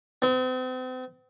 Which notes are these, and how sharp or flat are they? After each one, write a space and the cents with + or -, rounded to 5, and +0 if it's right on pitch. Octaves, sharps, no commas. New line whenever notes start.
C4 -40